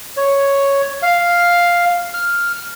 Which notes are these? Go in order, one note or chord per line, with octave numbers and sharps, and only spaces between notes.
C#5
F5
F6